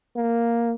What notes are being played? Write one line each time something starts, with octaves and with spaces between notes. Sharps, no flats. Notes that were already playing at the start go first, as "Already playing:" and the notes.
A#3